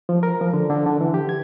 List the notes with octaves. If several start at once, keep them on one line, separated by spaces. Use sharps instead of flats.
F3
A#4
F3
D3
D3
D3
E3
G4
G#6